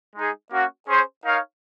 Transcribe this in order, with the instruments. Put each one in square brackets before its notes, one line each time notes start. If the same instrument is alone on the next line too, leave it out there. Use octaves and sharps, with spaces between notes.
[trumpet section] G#3 D#4 G#4
A#3 C#4 F#4
C#4 G#4 C5
D#4 A#4 C#5 F5